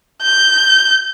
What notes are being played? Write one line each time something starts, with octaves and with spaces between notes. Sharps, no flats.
G6